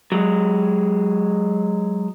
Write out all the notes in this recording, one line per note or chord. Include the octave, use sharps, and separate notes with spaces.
F#3 G#3